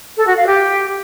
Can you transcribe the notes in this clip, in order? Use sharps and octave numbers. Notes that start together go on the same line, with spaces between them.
A4
F#4
F5
G4